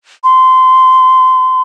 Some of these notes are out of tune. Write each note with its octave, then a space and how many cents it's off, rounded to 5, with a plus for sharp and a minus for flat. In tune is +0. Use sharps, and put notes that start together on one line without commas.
C6 -20